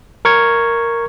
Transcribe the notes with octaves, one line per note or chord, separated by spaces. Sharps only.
A#4 C#6 G#6